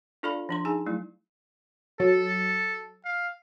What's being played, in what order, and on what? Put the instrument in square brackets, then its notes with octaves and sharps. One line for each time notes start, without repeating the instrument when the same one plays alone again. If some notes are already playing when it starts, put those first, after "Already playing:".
[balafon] D4 F4 A4 D5 F5 B5
F3 D4 C6
D#4 G#4 G#5 A5
F#3 A3 E4
[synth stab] F#3 [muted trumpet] A4
[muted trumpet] F5